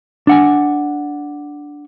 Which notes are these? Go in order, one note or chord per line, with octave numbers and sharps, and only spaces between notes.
D4 F#5 G#5